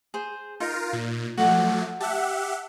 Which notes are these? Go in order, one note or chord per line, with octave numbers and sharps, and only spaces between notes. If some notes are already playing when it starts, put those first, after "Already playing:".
G#4 C5
D#4 F4 A#4
A#2
F3 F#3 A3 F#4 D5
G4 E5 F#5 A5